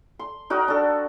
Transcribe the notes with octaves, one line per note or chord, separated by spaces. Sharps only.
C6
D#4 F#4 A#4 G5
D4 A4